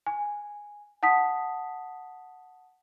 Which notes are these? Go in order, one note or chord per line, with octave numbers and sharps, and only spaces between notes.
G#5
F#5 A5 D#6 B6